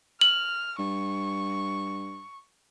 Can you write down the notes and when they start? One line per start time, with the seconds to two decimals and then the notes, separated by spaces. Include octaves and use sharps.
0.21 F6 F#7
0.79 G2 C#6